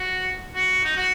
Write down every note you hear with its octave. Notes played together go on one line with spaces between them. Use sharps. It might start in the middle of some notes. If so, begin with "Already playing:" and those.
Already playing: F#4
F#4
D#4
F#4